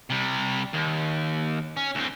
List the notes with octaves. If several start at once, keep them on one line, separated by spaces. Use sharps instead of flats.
C3 G3
D#2
C#4
D2 C4